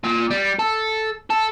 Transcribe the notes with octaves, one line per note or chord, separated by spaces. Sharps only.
A#2
G3
A4
A4